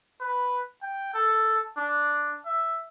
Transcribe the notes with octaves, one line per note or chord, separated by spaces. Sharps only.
B4
G5
A4
D4
E5